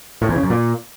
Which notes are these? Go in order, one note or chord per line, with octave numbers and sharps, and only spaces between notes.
A2
E2
C#3
F#2
A#2